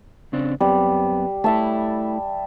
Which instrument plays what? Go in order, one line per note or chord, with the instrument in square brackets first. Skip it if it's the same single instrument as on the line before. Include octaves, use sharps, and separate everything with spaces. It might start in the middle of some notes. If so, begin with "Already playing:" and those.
[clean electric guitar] C#3 C4 D4
[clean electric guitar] F#2 B3 C4 [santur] G3
[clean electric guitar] A3 E4 [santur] E5 A5